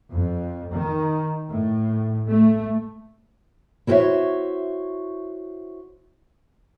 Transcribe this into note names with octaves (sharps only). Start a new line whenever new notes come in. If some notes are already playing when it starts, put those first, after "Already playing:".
F2
D#3
A2
A3
E4 F#4 A#4 C5 C#5 E5